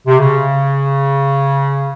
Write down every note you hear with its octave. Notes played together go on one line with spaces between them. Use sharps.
C3
C#3